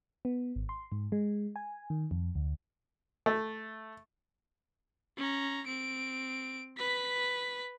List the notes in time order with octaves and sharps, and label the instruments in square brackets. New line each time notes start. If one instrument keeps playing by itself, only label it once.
[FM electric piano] B3
G#1
C6
G#2
G#3
G#5
D#3
F2
D2
[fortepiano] A3
[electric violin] C#4 A#5
C4 D7
B4 B6